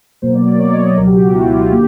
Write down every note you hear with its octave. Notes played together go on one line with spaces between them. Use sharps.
B2 F#3 A#3 C5
D5
D5
C#5
D#5
D5
C#2 B2 F#3 A#4
G4
F#4
F4
E4
E4
F4
D3 A#3 G4